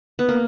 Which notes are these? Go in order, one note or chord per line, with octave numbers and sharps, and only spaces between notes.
B3
A#3